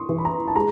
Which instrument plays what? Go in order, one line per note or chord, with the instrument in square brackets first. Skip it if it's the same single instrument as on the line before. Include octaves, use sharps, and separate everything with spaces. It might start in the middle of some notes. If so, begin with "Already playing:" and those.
Already playing: [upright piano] C6 C#6 D#6
[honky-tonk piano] E3
[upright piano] B5
A#5
A5
[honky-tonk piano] G#3 [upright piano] A#5